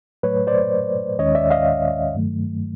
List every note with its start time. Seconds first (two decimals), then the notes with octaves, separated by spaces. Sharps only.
0.23 A2 F#3 A3 B4 C#5
0.47 C5 D5
1.19 D#2 D#3 G#3 C#4 C#5 D#5
1.35 D5 E5
1.51 D#5 F5
2.15 G2 D#3 F#3 A3